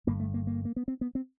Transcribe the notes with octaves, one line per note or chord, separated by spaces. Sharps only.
G1 G2 D3 A#3
A3
A#3
A#3
A#3
B3
C4
B3
C4